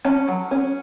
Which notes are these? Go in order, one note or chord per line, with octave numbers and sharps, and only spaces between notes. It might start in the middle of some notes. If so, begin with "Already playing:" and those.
C#4 A5
F#3
C#4